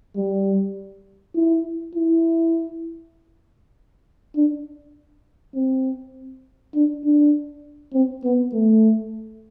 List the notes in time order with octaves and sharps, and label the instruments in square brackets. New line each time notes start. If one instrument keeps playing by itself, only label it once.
[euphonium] G3
E4
E4
D4
C4
D4
D4
C4
B3
A3